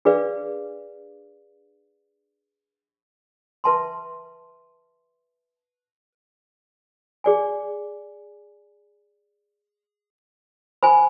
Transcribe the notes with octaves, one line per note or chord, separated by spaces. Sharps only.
D4 G#4 B4 D5 F5
B4 E5 A5 C6
G#4 D5 G#5
C5 G#5 B5